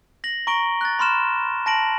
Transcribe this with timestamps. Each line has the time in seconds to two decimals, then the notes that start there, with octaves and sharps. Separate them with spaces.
0.24 A#6 F#7
0.47 A#5 C#6 A#6 D7 G7
0.81 F#6 A6
0.99 B5 C6 F6 E7
1.66 A5 A#6 D7 F#7